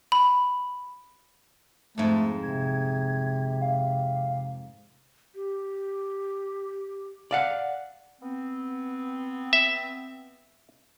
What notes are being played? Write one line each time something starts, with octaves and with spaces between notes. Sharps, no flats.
B5
F2 G#2 A3
C3 G#6
F5
G4
D5 F5 F#5
B3 C4
E5